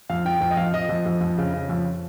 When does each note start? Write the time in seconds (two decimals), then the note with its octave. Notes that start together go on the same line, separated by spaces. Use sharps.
0.10 F2 F5
0.25 F3 G5
0.41 F2 G5
0.51 D#5
0.57 F2 F5
0.74 F2 D#5
0.89 F2
1.06 F2
1.21 F2
1.38 C#3
1.54 C#3
1.69 F2